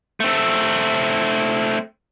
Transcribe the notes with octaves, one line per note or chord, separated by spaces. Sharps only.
A3 C4